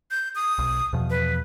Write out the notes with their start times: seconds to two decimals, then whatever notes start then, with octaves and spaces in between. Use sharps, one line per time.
0.11 G6
0.35 D#6
0.58 B1
0.93 E2 B2 F3
1.10 B4